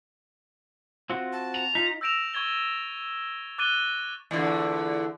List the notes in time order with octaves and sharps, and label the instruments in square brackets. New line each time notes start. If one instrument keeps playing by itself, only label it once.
[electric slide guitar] C4 F4 F#4
[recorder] A5
[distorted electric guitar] A#5
[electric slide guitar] D#4 [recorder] F4 [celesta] B6
[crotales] E6 G6 A#6 D7 E7 F7
C#6 G#6 A6 G7
D6 F#6 A6 D#7 G7
[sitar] E2 A#2 D3